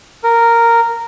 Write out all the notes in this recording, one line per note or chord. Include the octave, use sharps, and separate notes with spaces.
A#4